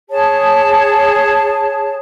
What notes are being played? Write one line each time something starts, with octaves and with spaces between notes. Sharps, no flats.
G#4 C#5 A5